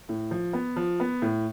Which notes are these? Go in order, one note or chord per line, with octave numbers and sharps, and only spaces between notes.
A2
F3
B3
F3
B3
A2